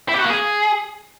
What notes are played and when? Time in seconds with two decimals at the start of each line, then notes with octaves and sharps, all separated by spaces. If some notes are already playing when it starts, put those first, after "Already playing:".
0.09 E4
0.14 G4
0.19 F#4
0.25 A#3
0.30 G#4